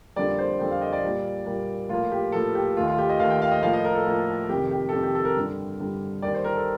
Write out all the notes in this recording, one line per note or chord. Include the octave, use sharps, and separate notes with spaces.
F2 D3 G3 A#3 D5
C5
F2 D3 G3 A#3 G5
F5
D#5
D5
A#2 G3 A#3
A#2 G3 A#3
A2 F3 A#3 F4
G4
A2 F3 A#3 A4
G4
D#2 D#3 A3 F4
F4
G4
D#5
D#2 D#3 A3 F5
G5
F5
D#5
A2 F3 A#3 F5
D#5
A#4
A4
A2 F3 A#3
F2 C3 D#3 G4
G4
A4
F2 C3 D#3 G4
G4
A4
A#4
G2 D3 G3
G2 D3 G3
D#2 D#3 G3 D5
C5
A#4
A4